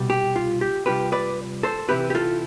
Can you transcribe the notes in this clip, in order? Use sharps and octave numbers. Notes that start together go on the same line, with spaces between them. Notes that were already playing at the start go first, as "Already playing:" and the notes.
Already playing: C2 B2 G3
G4
F4
G4
C3 G3 D4 F4 G4 B4
B4 D5
A4 C5
C3 E3 G3 C4 E4 G4 B4
G4
F4 A4